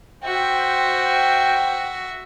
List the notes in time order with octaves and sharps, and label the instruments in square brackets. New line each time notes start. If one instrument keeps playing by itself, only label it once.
[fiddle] F#4 E5 [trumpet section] C5 G5